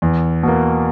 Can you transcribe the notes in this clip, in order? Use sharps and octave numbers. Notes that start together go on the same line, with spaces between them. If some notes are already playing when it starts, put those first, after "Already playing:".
E2
B2 A#3